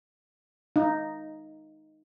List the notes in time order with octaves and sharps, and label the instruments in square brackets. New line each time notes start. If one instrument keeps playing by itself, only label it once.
[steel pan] D#4